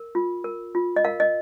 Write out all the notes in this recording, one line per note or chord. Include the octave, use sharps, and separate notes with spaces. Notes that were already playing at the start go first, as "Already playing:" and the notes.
Already playing: A#4
F4
A#4
F4
D#5
A#4 F5
D#5